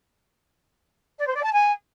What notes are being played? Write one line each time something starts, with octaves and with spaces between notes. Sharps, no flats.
D5
C5
D5
A5
G#5